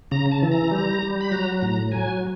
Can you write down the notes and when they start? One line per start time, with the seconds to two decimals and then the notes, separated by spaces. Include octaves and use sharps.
0.11 C#3 A#5
0.32 A5
0.42 E3
0.51 A#5
0.71 G3
1.03 G3
1.21 B5
1.31 F#3 A#5
1.61 A2 A#5
1.92 F#3 G#5